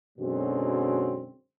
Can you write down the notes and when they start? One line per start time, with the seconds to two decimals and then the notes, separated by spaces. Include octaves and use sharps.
0.19 F#2 B2 D3 F#3 G#3 C4